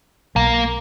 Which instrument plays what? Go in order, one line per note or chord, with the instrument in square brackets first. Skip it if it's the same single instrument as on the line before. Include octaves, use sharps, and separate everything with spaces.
[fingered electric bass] B1 [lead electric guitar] A#3